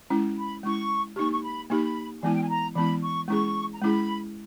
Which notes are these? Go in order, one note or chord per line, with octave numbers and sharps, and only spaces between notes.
G#3 C#4 E4
B5
G#3 C#4 E4 C#6
A#3 D#4 G4 C#6
C#6
B5
A#3 D#4 G4 B5
E3 G#3 B3 E4 G#5
G5
G#5
A#5
E3 G#3 B3 E4 B5
C#6
G#3 C#4 E4 G#4 C#6
A#5
G#3 C#4 E4 G#4 B5